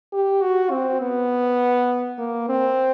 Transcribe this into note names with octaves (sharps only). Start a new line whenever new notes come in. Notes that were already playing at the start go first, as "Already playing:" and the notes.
G4
F#4
C4
B3
A#3
C4